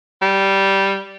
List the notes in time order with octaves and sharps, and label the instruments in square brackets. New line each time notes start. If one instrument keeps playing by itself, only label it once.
[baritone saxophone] G3